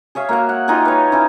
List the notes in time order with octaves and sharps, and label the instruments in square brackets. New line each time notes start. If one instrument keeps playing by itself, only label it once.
[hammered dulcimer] G#4 C#5 E5 F5
A#3 F#4 E5
F#5
D#4 F4 G4 G#4
B4 C#5
C#4 D#4 E4